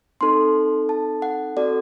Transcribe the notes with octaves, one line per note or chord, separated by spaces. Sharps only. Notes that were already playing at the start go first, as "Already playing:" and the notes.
C4 D#4 A4 C6
A5
F#5
C4 F#4 A4 D5